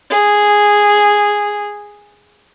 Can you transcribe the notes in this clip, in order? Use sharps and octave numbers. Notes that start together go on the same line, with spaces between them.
G#4